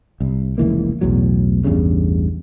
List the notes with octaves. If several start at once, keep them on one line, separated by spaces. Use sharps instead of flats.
C2
F1 C#2 E3 A#3
B1 E2 A2 F#3
A1 E2 G2 C#3